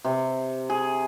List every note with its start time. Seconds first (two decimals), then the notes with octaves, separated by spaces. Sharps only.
0.05 C3
0.70 G#4